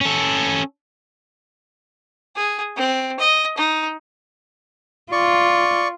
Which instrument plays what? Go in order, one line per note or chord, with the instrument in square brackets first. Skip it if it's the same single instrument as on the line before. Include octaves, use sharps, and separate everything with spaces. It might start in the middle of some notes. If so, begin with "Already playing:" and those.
[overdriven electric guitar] C#4 A4
[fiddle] G#4
C4
D#5
D#4
[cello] F4 [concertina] D5 C#6